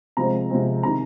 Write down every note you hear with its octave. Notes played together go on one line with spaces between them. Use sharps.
C3 F3 G#3 C4 A#5
C3 F3 G#3 C4
C3 D#3 A#5